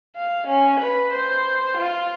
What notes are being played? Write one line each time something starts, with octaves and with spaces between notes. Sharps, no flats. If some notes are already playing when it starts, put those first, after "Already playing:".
F5
C#4
B4
C5
F4